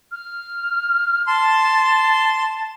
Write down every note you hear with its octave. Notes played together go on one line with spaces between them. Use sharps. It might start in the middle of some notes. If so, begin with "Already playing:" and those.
F6
A5 C6